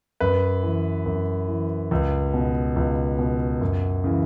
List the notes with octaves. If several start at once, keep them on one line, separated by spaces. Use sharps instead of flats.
F#2 B4
E3
F#2
E3
C#2
B2
C#2
B2
F#2
C#3 E3